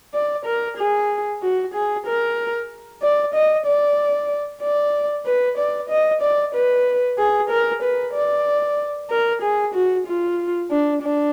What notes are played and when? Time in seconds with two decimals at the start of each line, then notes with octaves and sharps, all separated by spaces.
0.14 D5
0.46 A#4
0.77 G#4
1.42 F#4
1.74 G#4
2.06 A#4
3.02 D5
3.34 D#5
3.66 D5
4.62 D5
5.26 B4
5.58 D5
5.89 D#5
6.22 D5
6.55 B4
7.18 G#4
7.50 A#4
7.82 B4
8.14 D5
9.10 A#4
9.42 G#4
9.74 F#4
10.07 F4
10.71 D4
11.02 D4